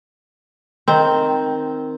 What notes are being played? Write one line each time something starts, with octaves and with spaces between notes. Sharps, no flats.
D#3 C4